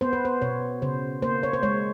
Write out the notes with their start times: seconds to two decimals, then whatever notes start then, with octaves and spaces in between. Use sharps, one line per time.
0.01 B3 C5
0.13 B4
0.25 C5
0.42 B2 C#5
0.82 C#3 C5
1.22 A#3 C5
1.43 C#5
1.53 C5
1.63 G#3 C#5